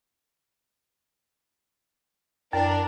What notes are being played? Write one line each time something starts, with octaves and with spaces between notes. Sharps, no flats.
F#2 D4 A#4